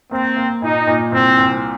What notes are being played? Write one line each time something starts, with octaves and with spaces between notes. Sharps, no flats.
A#3 C4
A#3
A#2 D#4
A#2
C2 C4
C2